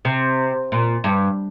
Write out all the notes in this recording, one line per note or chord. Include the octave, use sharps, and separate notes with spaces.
C3
A#2
G2